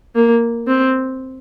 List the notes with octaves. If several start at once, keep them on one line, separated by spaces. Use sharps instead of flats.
A#3
C4